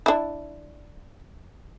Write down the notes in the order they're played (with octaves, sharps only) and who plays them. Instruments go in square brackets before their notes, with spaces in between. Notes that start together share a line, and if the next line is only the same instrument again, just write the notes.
[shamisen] D4 E4